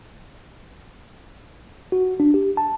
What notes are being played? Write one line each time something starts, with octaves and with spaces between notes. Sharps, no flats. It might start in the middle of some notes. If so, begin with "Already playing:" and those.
F#4
D4
G4
A5